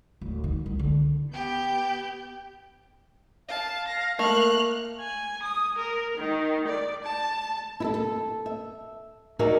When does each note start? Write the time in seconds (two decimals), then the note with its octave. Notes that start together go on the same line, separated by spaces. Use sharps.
0.21 D1
0.44 D#3
0.66 C2
0.79 D3
1.33 B3 G4 G6
3.48 F5 A5
3.87 A#6
4.19 A3 A#3 F6 F#6
5.00 G#5
5.43 D#6
5.77 A#4
6.17 D#3
6.67 D5
7.02 A5
7.80 E4 A4
7.94 A4
8.46 E5
9.39 D#4 F#4 G#4 A#4 D5 E5